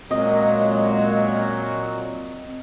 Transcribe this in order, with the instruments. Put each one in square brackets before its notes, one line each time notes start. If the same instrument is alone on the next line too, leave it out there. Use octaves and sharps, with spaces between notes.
[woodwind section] F#2 G#3 [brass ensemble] A#2 F#3 [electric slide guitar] C4 [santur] D#5